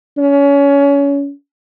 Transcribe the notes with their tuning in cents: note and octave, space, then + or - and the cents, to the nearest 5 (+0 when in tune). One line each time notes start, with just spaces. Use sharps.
C#4 +25